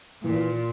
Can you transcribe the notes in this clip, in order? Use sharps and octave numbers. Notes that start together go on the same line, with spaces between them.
A#2 E3